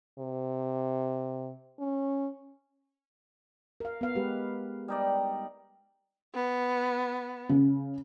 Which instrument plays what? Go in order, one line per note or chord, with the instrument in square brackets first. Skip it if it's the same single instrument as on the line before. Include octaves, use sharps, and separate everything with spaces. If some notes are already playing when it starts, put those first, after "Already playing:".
[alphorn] C3
C#4
[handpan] A#4 F5
B3 F5
G#3 G4 B4
[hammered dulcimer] G3 D#4 D5
[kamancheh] B3
[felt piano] C#3